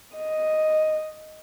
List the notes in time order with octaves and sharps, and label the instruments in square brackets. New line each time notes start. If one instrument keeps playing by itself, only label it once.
[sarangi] D#5